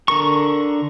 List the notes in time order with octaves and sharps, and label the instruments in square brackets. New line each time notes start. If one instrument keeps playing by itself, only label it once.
[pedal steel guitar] D3 A#4 C#6